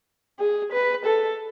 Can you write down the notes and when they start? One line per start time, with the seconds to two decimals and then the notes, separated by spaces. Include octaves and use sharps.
0.40 G#4
0.72 B4
1.05 A4